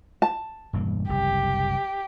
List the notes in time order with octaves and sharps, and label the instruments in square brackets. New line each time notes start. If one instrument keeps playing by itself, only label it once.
[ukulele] A5
[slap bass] E1 G2 A#3
[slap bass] F#1 C2 [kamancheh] G4